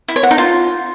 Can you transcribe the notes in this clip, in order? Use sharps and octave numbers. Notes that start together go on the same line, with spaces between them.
E4
C#5
F#5
D#4
F4